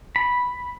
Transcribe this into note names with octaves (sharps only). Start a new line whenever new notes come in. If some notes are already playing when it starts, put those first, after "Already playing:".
B5